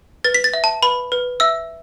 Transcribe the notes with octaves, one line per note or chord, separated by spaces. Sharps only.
B4 A6
B6
A6
E5
A5
B4 B5
B4
E5 E6